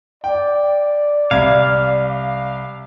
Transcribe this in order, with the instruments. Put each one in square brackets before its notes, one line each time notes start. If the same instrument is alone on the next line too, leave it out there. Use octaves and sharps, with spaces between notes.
[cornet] D5 [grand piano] G5
[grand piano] C2 G#6 [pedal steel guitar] F5